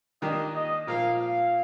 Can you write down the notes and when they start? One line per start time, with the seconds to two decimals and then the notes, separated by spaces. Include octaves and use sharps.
0.22 D#3 A#3 D4 G4 D#5
0.54 D#5
0.87 A#2 F3 A#3 F5
1.20 F5